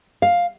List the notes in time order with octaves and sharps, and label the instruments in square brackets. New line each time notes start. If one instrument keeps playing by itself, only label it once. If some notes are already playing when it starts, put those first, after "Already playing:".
[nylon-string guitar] F5